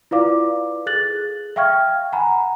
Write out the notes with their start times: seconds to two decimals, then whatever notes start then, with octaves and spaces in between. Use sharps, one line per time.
0.11 E4 F4 B4 D5 F5 D6
0.86 G#4 A4 F#6 A6 F#7
1.56 E5 F5 G5 C#6 F6 G#6
2.12 F#5 G#5 A#5 B5